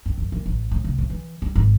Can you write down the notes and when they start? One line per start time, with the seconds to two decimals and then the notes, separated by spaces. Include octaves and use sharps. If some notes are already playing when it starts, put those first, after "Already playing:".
0.06 G2
0.18 F#2
0.32 A#2
0.46 A1
0.71 A2
0.84 C2
0.98 A2
1.10 E3
1.42 G3
1.55 G#1